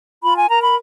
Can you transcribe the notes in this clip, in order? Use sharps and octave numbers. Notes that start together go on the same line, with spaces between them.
F4 B5
G#5
A#4 A#5
B5